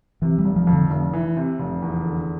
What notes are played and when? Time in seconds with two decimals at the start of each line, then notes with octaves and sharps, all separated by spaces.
0.22 C3 E3
0.38 G3
0.45 F1
0.56 F3
0.67 F2
0.73 D3
0.90 F1
1.13 E3
1.37 C3
1.59 F1
1.82 E2
2.05 D3